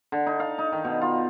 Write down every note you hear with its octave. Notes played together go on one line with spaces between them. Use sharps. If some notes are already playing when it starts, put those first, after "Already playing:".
D3
D#4
F5
D#4
D#3
B2
F4